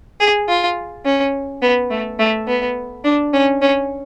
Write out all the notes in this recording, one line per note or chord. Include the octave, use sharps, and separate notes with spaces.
G#4
F4
C#4
B3
A3
A3
B3
D4
C#4
C#4